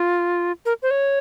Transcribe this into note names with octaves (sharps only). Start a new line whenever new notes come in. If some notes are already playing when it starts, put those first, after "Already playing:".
Already playing: F4
A#4
C5
C#5